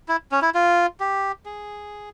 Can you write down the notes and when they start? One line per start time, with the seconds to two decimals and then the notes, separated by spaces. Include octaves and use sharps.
0.08 E4
0.32 C#4
0.42 E4
0.55 F4
1.00 G4
1.46 G#4